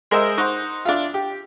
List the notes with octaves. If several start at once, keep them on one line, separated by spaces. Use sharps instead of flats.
G#3 A#4 C5 D#5 E5
D#4 C5 F#5 C#6
D4 E4 F4
G4